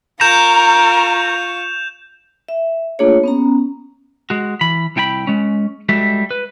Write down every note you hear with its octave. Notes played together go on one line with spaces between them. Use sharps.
F4 A#4 A#5 C#6 G6 E7 F7
E5
A3 A#3 D4 F4 G#4 C#5
B3 C#4 A#5
G#3 F#4
E3 B5
C2 E4 G5 G#5 B5
G#3 C#4
G3 G#3 F#4 A4 E5
B4